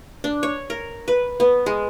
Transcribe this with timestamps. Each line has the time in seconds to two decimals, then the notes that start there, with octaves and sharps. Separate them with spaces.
0.24 D4
0.43 C#5
0.70 A#4
1.08 B4
1.40 B3
1.66 G#3